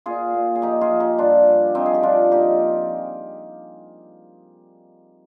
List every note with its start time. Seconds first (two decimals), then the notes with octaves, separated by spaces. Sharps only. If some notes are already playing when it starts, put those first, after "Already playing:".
0.06 A#2 F4 G#4
0.34 A#2
0.55 G#4
0.62 F3 D#4 G4
0.81 F4 G#4
0.91 F3
1.00 D#4 G4
1.18 G2 D4 F4
1.47 G2
1.75 F3 C4 D#4
1.86 G#4
1.94 G4
2.03 F3 D4 F4
2.31 A#2 D#4 G4